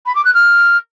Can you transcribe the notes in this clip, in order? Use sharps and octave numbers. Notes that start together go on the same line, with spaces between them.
B5
D6
F#6
F6